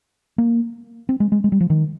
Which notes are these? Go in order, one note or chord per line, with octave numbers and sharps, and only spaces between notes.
A#3
C4
G#3
G#3
G#3
G3
F3
D#3